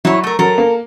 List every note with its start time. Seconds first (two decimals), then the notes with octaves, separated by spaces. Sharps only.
0.05 F#3 E4 C#5
0.24 A3 A#4
0.39 F#3 A4 A#4
0.58 A#3